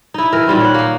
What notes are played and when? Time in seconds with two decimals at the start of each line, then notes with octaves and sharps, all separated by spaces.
0.14 D#4 E4
0.33 E3 A#4
0.47 A#2 D#3 G3 C4
0.60 C#5 F#5
0.74 A#3 D#4